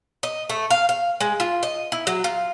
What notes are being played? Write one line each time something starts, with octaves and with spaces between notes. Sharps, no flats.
D#5
A3
F5
F5
G#3
F4
D#5
E4
F#3
F4